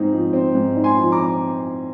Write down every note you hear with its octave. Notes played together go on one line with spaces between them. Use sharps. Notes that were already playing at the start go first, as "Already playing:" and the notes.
Already playing: G#2 C4 D#4
F3
C4
G#2
D#4
G#5 C6
F3
A#5 D6
C4